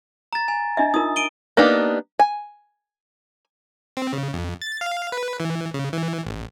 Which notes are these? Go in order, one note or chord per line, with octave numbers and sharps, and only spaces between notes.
A#5 A6
G#5
D4 D#5 E5
D#4 F4 A#4 D#6
D7 D#7 G7
A#3 B3 D4 D#4 G4
G#5
C4
C#3
F2
A6
F5
B4
E3
C#3
E3
A1